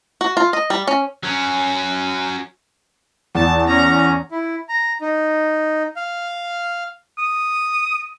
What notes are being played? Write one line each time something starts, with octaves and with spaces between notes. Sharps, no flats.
F#4
F4
D#5
G3
C#4
F#3 C#4
E2 A5
C#4 A#5
E4
A#5
D#4
F5
D#6